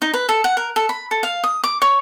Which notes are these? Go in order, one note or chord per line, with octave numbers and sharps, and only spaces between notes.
D#4
B4
A4
F#5
A#4
A4
B5
A4
F5
D#6
D6
C#5